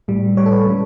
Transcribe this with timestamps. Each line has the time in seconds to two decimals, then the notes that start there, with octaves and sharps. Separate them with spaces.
0.08 A2 G3
0.37 A2 G3 C#5
0.46 A4
0.52 B4
0.66 C#3 G3